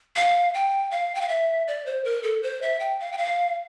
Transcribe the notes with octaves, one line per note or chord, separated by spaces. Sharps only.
F5
G5
F5
G5
F5
E5
D5
C5
A#4
A4
C5
E5
G5
F5
G5
F5